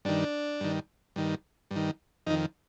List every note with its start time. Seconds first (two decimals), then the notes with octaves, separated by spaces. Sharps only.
0.05 G2 D#3 D4
0.61 G2 D#3
1.16 G2 D#3
1.71 G2
1.76 D#3
2.27 F2 D#4
2.30 D#3